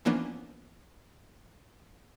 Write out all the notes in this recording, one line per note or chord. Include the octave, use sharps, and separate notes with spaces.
E3 F3 A#3 B3 C#4 D4